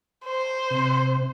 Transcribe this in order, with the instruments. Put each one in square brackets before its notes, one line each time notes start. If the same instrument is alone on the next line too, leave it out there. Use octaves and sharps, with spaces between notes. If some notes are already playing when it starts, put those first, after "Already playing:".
[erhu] C5
[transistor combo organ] C3